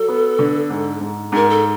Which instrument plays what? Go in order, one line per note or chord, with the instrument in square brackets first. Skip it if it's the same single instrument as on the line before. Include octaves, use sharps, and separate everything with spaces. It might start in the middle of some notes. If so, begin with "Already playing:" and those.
Already playing: [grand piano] F#3 [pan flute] A4
[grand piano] B3
D3
G#2
G#2
[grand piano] G#2 [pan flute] A#4
[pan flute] A4